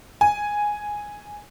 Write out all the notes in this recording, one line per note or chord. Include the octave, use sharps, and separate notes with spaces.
G#5